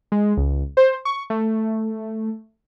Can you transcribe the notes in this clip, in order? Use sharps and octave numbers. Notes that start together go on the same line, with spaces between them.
G#3
C#2
C5
C#6
A3